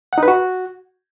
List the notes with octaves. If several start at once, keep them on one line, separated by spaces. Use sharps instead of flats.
F#5
D#4
B4
F#4